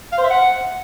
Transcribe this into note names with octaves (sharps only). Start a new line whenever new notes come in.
F5
C5
E5
F#5